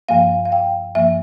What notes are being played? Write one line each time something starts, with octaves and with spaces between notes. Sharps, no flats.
G2 F3 A#3 F5
F5
G5
G2 F3 A#3 E5